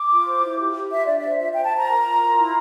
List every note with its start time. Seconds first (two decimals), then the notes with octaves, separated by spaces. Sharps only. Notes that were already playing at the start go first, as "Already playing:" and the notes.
Already playing: D6
0.10 F4
0.26 C5
0.42 E4
0.58 G4
0.75 G4
0.90 F4 E5
1.04 D4 D5
1.15 E5
1.24 C5
1.39 F4 E5
1.52 G5
1.56 C5
1.63 A5
1.72 C5 A#5
1.88 A#4
2.04 F4
2.21 F4
2.37 E4